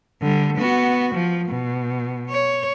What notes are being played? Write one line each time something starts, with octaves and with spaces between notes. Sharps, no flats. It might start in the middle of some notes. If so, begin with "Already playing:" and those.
D3 G3
B3 F#4
F3
B2
C#5